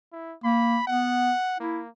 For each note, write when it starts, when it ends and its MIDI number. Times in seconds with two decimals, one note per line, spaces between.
0.12 0.35 64
0.44 0.78 58
0.44 0.86 83
0.87 1.31 59
0.87 1.57 78
1.60 1.89 58
1.60 1.81 64